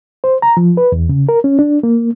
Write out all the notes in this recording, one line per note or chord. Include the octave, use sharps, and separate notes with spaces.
C5
A#5
F3
B4
E2
C#3
A#4
C#4
D4
A#3